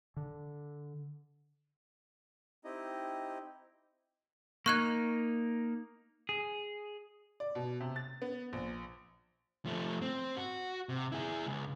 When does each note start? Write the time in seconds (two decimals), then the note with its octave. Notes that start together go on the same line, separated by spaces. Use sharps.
0.17 D3
2.65 C4 D#4 E4 G4 D#5
4.66 A#3 D#4 C#6 F#6 G#6
6.29 G#4
7.40 D5
7.55 B2
7.80 C3
7.96 A6
8.22 B3
8.53 A#1
9.65 F3 A3
10.01 C4
10.36 F#4
10.89 C3
11.12 E4 G#4
11.46 C#2